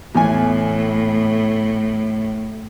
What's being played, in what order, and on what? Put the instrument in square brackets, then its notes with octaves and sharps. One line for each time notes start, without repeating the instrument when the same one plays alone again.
[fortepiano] E2 G#5 [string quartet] A2